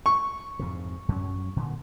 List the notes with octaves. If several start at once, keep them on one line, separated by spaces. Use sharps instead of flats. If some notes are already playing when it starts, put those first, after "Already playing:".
C#6
F2 G#2 C3
F#2 F#3 C#4
A#2 D3